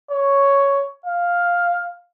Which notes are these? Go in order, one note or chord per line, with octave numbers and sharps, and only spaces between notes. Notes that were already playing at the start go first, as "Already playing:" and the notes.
C#5
F5